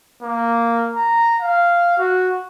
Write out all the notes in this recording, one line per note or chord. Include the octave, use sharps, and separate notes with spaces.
A#3
A#5
F5
F#4